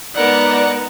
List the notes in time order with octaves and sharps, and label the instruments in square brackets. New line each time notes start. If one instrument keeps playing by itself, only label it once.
[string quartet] G#3 B3 D#4 [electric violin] A#4 F#5 [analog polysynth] D5